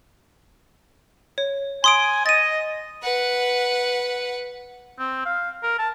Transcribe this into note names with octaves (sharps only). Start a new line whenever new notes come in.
C#5
G#5 C6 D#6 D7
D#5 A6 D#7
B4 F#5
C4
F5
A#4
A5